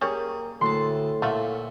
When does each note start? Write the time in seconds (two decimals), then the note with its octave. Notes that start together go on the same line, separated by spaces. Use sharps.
0.01 G3 A#3 C#4 G#4 C#5
0.61 D2 A2 A5 C6
1.22 A#2 A3 F4 F#4 E5